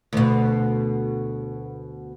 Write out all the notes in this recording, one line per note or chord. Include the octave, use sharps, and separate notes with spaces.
D2 B2